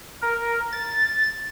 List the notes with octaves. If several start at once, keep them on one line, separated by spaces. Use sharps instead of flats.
A#4
A6